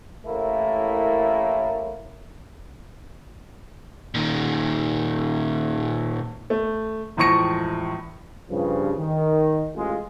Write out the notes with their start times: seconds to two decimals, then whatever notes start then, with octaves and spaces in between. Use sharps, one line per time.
0.25 A1 A2 A3 A#3 E4 A#4
4.15 A#2 D#3
6.50 A3
7.17 E1 A2 F3 C#6 A#6 C#7
8.49 G2 C#3 F3
8.98 D#3
9.75 A1 G#3 F4